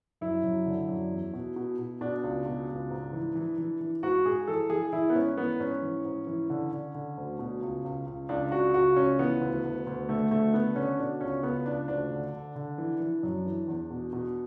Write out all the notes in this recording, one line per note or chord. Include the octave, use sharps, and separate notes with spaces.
F#2 E4
F#2
D3
F#2
E2
B2
B2
B2
B2 D4
C#2
B2
C#2
G#2
E3
E3
E3
E3
G#2 F#4
G#2 G#4
E3 A4
E3 G#4
E3 E4
B3
G#2 C#4
E3 B3
G#2 C#4
E3
G#2
E3
D3
D3
D3
D2
B2
C#2
C#2
C#2
C#2 D4
C#3 F#4
C#2 F#4
C#2 C#4
E3 B3
D2
D2
D2
D3 A3
D2 A3
D3 B3
D3 C#4
B2 D4
C#2 C#4
C#2 B3
C#2 D4
D2 D4
D3
D3
D3
E3
E3
F#2
E3
E2
B2
B2